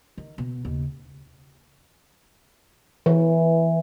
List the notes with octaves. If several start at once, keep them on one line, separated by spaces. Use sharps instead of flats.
D#3
B2
D#2 C#3
E3